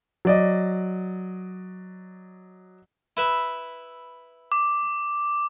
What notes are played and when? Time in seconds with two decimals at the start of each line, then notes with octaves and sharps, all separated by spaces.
0.25 F#3 D5 D#5
3.17 E4 B4 E5
4.52 D6